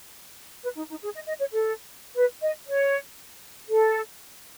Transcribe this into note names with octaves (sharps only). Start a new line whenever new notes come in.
B4
D#4
D#4
G#4
D#5
D#5
C#5
A4
B4
D#5
C#5
A4